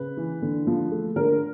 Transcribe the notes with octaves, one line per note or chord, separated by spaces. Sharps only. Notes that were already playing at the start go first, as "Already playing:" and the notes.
Already playing: C#3 B4
E3
D3
F3
A3
D3 A#4